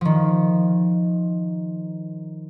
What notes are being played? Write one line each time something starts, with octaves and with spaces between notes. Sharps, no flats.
D#3 F3